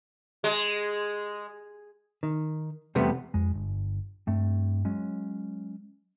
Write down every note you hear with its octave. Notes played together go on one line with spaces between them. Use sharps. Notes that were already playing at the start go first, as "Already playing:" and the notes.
G#3
D#3
E2 C3 G3 A3 B3
F2 G#3
G1
G2 A3 C4
F#3 G#3 C#4